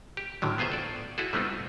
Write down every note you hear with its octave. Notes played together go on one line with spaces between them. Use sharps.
G4
A2 D3 D#3 F#3
B3 F4 G#4 C5 E5
A4 D5
E4 F#4 G#4 A4
G3 A3 B3 C4 D#4 F4